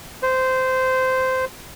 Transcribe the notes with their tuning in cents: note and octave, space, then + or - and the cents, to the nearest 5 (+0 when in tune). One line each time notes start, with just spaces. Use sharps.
C5 -15